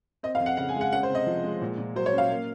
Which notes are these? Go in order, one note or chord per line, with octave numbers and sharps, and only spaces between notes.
C4 D#5
F5
F2
F#5
C#3 F#5
G#5
G#3
F#5
C#4 F#5
C5
C3
D#5
F3
G#3
A#2
A#2
F#3 C5
C#5
C#4
F5
A#3